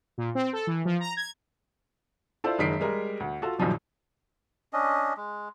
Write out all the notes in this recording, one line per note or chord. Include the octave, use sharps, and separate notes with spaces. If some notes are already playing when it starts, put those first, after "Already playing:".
A#2
C4
A4
E3
F3
A#5
G#6
E4 F4 A4 C5 D5
F#1 D#3 G#3 B6 C7 D7
G3 G#3 A#4
D2
F4 F#4 A4
A#1 F#2 D#3 F3 G3
C#4 D4 D#5
G#3